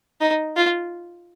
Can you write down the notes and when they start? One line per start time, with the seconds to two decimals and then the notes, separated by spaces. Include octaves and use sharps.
0.21 D#4
0.56 F4